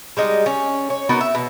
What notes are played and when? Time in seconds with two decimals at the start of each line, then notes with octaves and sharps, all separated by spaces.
0.17 G3 G#3 D#4
0.46 C#4
0.90 C#5
1.09 B3 D#4 F#4 A#4
1.21 E5
1.35 B2